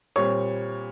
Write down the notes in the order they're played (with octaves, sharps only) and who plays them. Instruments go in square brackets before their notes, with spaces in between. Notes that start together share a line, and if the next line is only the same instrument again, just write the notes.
[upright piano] A#2 G3 C4 C#5 C#6